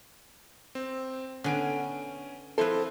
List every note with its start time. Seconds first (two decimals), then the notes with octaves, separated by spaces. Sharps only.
0.75 C4
1.44 D3 B3 C#4 G#5 D7
2.58 F3 C4 E4 A4 B4 C6